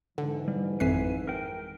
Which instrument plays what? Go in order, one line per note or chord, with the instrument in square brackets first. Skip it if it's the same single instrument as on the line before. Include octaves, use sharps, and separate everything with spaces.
[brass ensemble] G#2 E3 [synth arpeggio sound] D3
[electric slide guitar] G3
[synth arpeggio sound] G#1 F2 C7 [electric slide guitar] B4 E5 G#5
[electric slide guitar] A#4 G5